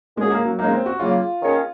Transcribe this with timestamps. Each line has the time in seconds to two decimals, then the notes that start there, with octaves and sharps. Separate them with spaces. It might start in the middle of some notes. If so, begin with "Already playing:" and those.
0.17 A#2 F#3 G#3 C#4 G#4
0.31 A#3
0.45 F#3
0.58 C#3 G#3 A#3 D#4
0.72 C4
0.86 F#4
0.99 C#3 F#3 A#3 F4
1.41 D#3 A#3 C#4 G#4 C#5